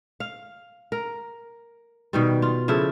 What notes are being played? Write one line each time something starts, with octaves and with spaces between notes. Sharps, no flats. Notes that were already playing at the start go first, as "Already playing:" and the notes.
F5
A#4
B2 D#3 G3
F4
C#3 F3 E4 A4